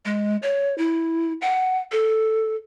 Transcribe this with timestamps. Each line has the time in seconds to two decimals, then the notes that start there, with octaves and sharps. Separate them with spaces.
0.05 G#3
0.42 C#5
0.78 E4
1.42 F#5
1.92 A4